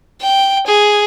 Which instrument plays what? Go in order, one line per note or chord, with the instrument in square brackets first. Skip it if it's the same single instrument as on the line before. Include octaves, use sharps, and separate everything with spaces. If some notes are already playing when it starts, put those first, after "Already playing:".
[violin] G5
G#4